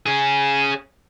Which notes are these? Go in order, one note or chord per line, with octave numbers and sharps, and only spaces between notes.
C#4 G#4